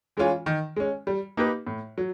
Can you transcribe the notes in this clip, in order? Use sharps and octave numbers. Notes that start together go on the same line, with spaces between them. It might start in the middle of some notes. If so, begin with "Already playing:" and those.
E3 G#3 C#4 F4
D#3
G#3 C#4
G3
A#3 D#4 G4 B4
A2
F#3